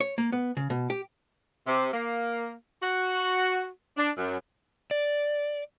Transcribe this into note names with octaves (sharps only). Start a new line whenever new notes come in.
C#5
A#3
B3
C#3
B2
G4
C3
A#3
F#4
D4
F#2
D5